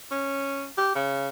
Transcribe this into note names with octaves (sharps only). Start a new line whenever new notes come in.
C#4
G4
C#3